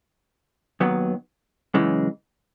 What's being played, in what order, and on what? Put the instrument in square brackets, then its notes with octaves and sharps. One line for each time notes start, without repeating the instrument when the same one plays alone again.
[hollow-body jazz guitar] D#2 D#3 F#3 B3
F#2 C#3 E3 G#3